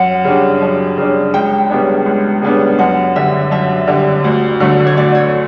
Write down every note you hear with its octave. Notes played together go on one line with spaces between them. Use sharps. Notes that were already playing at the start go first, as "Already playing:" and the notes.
Already playing: F#2 F#5
C#3 G3 D4
F#2
C#3 G3 D4
C#2 G5
C#3 G3 B3 D4
C#2
C#3 G3 B3 D4
F#2 F#5
D3 G3 E5
F#2 E5
D3 G3
D2
D3 F#3 A3
C#5
D2 D5
C#5